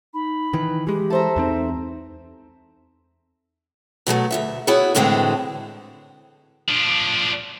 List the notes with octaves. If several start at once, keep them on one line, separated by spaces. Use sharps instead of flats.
D#4 B5
D#3 E3 B4
E3 G#3 G4
A4 C5 E5 A#5
E2 A3 C4 D#4
B2 F#3 G#3 A3
D2 C#3 E5
B3 E4 F#4 G#4 C#5
F#2 A2 D3 E3 G#3 C4
F3 D4